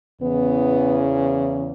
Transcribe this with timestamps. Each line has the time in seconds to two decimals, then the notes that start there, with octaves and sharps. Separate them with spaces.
0.21 E2 C#3 E3 B3